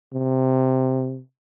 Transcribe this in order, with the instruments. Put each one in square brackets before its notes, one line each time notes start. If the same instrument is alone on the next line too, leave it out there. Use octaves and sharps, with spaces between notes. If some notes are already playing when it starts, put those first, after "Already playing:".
[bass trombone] C3